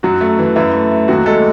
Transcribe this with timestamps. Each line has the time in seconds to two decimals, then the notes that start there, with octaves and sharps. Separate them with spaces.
0.03 F#2 F#3 F#4
0.21 A3
0.39 E3
0.56 F#2 E3 E4
0.73 A3
0.91 A3
1.08 D#2 F#3 F#4
1.26 G#3 A3 A4